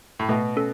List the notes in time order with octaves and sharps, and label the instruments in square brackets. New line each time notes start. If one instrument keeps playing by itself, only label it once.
[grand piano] A2
[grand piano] B2 [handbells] A3
[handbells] C#4 A4